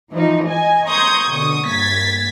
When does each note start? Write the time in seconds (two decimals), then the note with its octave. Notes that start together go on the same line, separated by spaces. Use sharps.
0.11 E3 F3 D#4
0.47 D#5 G#5
0.88 A#5 C6 C#6 D#6 G6 G#6
1.31 B2 D3 C#6 D#6
1.67 G2 A#3 G#6 A6 B6